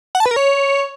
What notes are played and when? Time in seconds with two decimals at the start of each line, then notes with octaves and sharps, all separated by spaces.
0.15 F#5
0.20 A5
0.26 B4
0.31 A#4
0.36 C#5